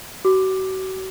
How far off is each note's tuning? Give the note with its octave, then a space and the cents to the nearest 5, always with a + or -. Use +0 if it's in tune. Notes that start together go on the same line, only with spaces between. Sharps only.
F#4 +35 D6 +10